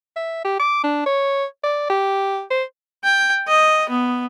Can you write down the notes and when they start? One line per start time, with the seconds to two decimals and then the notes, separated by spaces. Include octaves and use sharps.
0.16 E5
0.45 G4
0.60 D6
0.84 D4
1.06 C#5
1.64 D5
1.90 G4
2.50 C5
3.04 G5
3.47 D#5
3.89 B3